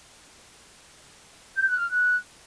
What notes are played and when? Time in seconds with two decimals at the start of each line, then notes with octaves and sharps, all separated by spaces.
1.56 G6
1.67 F#6
1.78 F6
1.89 F#6